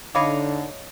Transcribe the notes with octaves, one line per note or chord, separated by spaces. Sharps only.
D3 D#4 C#5 D#5 F5 B5 D6